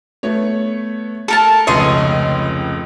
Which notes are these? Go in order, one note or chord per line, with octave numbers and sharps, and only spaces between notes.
A3 B3 C#5
A4 A#4 A5
F1 C#2 B4 C#5 D#5 C6